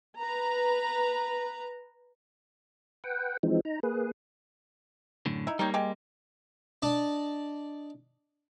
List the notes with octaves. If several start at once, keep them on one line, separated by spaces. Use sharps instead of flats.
B4 A#5
B4 F#5 G5
E3 F3 G#3 C4 D#4
D#4 A#5
A#3 G#4 B4
F#2 A2 D3
D#4 E4
G3 A#3 D#4 G4 C#5
G#3 G4
D4 D5 D#5